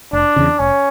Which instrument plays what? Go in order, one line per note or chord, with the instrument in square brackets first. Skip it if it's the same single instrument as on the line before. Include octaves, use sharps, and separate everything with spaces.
[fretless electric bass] F1 [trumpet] D4
[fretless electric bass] E2 C#3
[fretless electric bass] F1 [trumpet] C#4